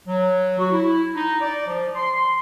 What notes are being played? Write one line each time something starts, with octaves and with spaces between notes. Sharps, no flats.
F#3
F#4
E4
D#4
D5
F3
C6
C6